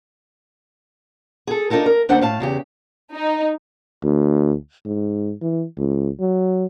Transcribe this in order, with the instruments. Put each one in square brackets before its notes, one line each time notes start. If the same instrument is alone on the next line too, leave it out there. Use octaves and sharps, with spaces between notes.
[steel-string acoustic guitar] G#4 A4
D4 D#4 F4 A4 A#4
A#4
D#2 D4 C5 F#5
A2 F5 A5
E2 C#3 G4
[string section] D#4
[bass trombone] D2
G#2
E3
C#2
F#3